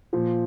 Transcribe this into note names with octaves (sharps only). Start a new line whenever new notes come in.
A#2 F3